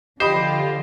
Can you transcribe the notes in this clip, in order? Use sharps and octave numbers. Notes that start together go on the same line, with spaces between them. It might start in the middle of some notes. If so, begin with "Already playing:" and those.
D3 F3 F4 G4 C5 D#5 B5